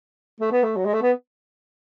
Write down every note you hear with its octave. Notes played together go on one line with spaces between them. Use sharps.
A3
B3
A3
F#3
G#3
A3
B3